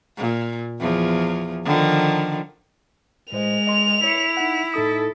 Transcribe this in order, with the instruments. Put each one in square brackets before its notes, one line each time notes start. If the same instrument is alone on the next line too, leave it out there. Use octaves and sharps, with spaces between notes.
[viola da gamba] A#2
E2 F3
D3 D#3 F3
[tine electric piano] A2 C5 D#5 [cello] G#3 [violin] F7
[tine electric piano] D#5 C6
[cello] E4 [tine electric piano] C#5 C#7
[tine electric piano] D#4 F#5
[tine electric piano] A2 D#4 D#6 [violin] A4